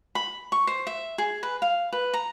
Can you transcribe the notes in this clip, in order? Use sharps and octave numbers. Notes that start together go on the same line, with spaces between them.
B5
C#6
C5
E5
G#4
B4
F5
B4
A#5